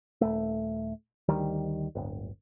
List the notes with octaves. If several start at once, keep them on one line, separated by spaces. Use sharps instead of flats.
D#1 A3
D2 D#3 G3
D1 G1